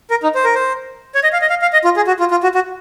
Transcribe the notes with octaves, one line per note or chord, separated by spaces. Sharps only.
A#4
D#4
C5
A#4
C5
C#5
D#5
F5
D#5
F5
F5
D#5
F4
G#4
F#4
F4
F4
F#4
F#4